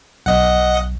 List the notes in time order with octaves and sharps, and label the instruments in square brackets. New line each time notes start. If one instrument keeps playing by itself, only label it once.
[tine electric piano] B1 [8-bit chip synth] D#5 F#5